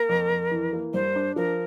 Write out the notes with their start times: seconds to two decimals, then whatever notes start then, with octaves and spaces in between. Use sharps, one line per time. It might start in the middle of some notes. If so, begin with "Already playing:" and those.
Already playing: A#3 A#4
0.09 F2
0.30 F2
0.51 E3
0.73 A#3
0.94 G2 C5
1.16 D4
1.36 F3 A#4